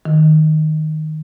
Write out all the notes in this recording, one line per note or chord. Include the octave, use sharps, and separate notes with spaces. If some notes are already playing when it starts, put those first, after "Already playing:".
D#3